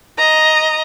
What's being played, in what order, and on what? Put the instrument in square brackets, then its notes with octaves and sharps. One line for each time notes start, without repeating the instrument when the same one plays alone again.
[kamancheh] D#5 A#5